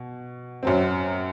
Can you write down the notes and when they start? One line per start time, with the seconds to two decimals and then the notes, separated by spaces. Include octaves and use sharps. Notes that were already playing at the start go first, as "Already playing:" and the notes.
Already playing: B2
0.63 F#2 F#3 C4